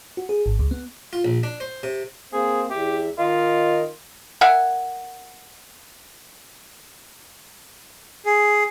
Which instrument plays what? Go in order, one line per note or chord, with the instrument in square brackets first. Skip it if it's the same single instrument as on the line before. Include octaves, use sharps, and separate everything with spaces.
[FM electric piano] F#4
G#4
G#1
C#2
B3
[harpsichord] F4
A#1
D4
C5
C3
[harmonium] A#3 C4 C5 [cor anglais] G#4
[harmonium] E2 E5 [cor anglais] G4
[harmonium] D#3 A#4 D#5 [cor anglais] F4
[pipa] A#4 E5 F#5 G#5
[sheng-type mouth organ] G#4